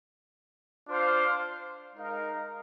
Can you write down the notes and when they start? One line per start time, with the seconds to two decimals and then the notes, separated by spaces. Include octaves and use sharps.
0.89 D4 F4 C5 F5
1.96 G#3 D#4 A#4 F5